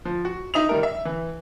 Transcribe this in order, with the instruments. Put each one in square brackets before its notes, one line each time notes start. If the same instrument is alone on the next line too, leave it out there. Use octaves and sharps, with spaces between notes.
[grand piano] F3
F#4
D#4 E5 D#6 F7
D#3 G3 A#4
E5
E3